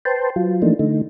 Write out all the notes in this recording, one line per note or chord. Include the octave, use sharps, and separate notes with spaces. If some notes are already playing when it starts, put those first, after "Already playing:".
B4 C5 G5 A5 C6
F#3 F4
E3 F3 A3 A#3 D4 D#4
D3 A3 D#4